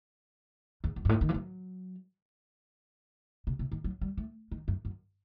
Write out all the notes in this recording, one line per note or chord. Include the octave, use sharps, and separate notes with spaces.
E2
F#2
G2
A2
D#3
E3
F#3
C3
C3
D#3
F#3
G3
A3
D#3
F#2
F#2